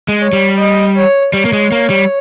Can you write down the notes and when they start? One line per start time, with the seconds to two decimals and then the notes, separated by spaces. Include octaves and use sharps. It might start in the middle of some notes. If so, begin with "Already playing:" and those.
0.08 G#3
0.21 C#5
0.33 G3
0.58 D#5
0.96 C#5
1.33 G3 C#5
1.45 A#3
1.53 G#3
1.72 A#3
1.90 G3